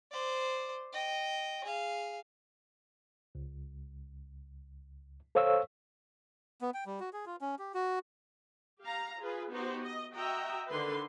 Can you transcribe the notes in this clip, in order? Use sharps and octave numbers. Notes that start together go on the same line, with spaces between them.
C5 D5
D#5 G5
G#4 F5
C#2
A4 C5 C#5 F5 C#6 E6
B3
G5
G3
F#4
G#4
F4
C#4
G4
F#4
G4 F5 A#5
F4 G#4 B4
B3 D#4 F#4 G4 C5
D#5
F#4 D#5 E5 G5 A#5
D3 D#3 A4 B4 C6